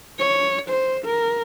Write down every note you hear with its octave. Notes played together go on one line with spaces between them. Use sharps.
C#5
C5
A#4